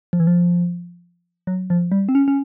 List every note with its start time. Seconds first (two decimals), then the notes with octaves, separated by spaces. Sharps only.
0.13 F3
0.20 E3
0.27 F3
1.47 F#3
1.70 F3
1.92 G3
2.09 C4
2.15 C#4
2.28 C#4